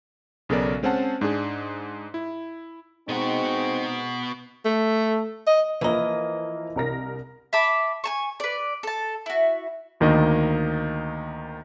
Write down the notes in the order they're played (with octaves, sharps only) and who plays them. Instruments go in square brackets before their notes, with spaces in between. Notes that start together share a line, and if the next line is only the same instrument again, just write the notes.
[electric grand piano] B1 C#3 B3 A4 A#4 D5
G#3 C4 C#4 C5 F#5 A5
G#2 D4 G#4
E4
[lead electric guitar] B2 F#4 [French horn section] G#3 C4 D#4
[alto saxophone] A3
D#5
[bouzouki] E3 D#5 [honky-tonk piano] F3 A#3 A#4
[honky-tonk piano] C2 A#4 A#6
[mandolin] E5 A5 B5 D6
G#5 A5 C#6
B4 D5
A4 A5
E4 F#4
[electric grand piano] D2 D#3 A#3 D#5